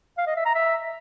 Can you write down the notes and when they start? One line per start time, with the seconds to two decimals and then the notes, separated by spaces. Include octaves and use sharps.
0.17 F5
0.27 D#5
0.36 E5
0.45 A#5
0.55 E5